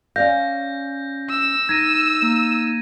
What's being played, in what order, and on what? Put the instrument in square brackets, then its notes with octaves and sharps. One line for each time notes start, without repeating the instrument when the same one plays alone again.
[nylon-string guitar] C#4 D5 F5 [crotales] G6 A#6
[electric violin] E6
[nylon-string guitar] D#4 [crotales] G#6 A#6 D#7
[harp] A#3